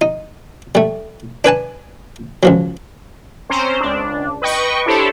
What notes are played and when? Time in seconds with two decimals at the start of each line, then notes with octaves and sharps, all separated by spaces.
0.01 D#4
0.75 G3 A3
1.44 D4 B4 G#5 A5
2.43 C#2 F3 F#3
3.49 C4 C#4 C5 A#5
3.81 C#2 D4
4.42 B4 D#5 G5 C#6
4.86 D4 E4 G4 A4 C5 C#5